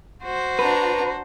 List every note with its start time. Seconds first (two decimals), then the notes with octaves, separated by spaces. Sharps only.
0.23 F#4 C5
0.59 D4 B4 A#5